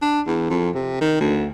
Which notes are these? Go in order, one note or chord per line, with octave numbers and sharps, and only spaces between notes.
D4
E2
F2
C3
D#3
D2